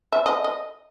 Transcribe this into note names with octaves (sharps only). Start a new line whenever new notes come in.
E5
D#5
D#5